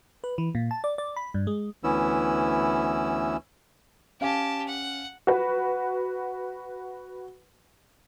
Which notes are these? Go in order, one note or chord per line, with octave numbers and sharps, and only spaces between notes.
B4
E3
A#2
A5
D5
D5
B5
G2
G#3
D2 E3 B3 C#4 E4 E6
C#4 G4 F5 G#5 A5
F#5
F#4 B4